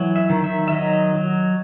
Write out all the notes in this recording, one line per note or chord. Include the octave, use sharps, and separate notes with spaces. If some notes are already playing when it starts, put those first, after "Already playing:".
Already playing: E3 F#3
E5
D#3
E5
E5
F#3 D#5
F#3